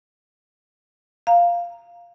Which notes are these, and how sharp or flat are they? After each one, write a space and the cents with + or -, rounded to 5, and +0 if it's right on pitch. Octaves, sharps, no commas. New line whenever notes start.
F5 -5 A#5 +0